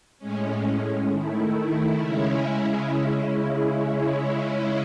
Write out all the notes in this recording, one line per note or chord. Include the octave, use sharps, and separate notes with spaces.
A2 G#3 C#4
D#3 A3 E4
C#3 G#3 C#4 E4